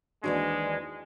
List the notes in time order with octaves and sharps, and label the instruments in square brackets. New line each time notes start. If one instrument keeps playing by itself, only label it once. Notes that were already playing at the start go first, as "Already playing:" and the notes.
[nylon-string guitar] D#2 E3 C5 [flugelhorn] G#3 [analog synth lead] D4 [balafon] F#4 D5